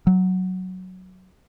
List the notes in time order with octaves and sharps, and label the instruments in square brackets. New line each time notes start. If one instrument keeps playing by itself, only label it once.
[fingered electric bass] F#3